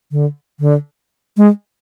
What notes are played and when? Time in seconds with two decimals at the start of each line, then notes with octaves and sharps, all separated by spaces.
0.11 D3
0.60 D3
1.37 G#3